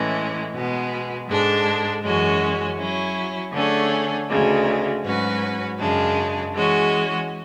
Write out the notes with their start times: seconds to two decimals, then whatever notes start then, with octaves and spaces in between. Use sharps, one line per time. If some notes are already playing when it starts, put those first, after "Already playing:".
Already playing: A2 E3 G#3 C#4
0.53 B2 G#3 B3
1.27 G#2 G#3 D4 A4
2.02 F#2 E3 G#3 C#4 F#4
2.77 F#3 C#4 E4
3.52 D3 A3 C#4 G#4
4.28 D2 C#3 G#3
5.03 G#2 F#3 C#4 F#4 B4
5.78 F#2 C#3 G#3 D4
6.54 E3 G#3 C#4 F#4